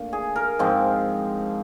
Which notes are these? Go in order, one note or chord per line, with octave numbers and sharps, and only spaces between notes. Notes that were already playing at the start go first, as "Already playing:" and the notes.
Already playing: A#2 A3 D4
G#4
A#4
G#2 F3 G#3 C4